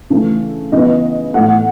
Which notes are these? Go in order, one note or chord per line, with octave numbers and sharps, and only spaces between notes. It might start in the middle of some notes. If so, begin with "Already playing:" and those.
C#3 E3 A3
C#3 E3 B3 D#5
A2 E3 A3 F#5